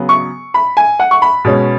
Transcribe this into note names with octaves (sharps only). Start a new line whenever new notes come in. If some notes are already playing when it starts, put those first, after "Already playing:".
Already playing: C#3 F#3 B3
C#6
B5
G#5
F#5
C#6
B5
B2 G#3 C#4